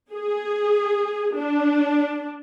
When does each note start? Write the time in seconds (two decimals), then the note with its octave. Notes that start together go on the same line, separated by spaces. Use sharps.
0.11 G#4
1.36 D4